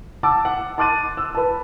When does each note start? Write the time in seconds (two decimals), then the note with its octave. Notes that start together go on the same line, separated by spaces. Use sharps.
0.23 F#5 A5 D6 E6
0.45 F#5
0.78 A5 C6 D6 F#6 A6 D#7
1.17 E6
1.35 B4 A5